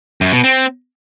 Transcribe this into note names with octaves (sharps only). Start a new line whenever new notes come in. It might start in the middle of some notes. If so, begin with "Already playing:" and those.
F#2
B2
C4